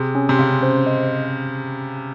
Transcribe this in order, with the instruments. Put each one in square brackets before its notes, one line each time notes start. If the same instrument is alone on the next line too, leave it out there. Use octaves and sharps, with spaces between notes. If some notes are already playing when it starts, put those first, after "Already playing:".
Already playing: [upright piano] C3 [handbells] G#4
[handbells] C#4
[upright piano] C3
[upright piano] C#3 [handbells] C#4
[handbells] C5
D#5